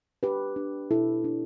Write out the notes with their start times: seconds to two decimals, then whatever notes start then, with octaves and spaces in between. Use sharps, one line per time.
0.23 D4 G4 B4
0.56 D4
0.91 B2 E4 A4
1.24 D4